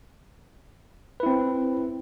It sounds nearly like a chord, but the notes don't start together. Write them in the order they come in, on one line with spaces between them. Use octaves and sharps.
B4 E4 C4